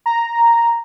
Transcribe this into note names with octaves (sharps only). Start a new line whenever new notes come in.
A#5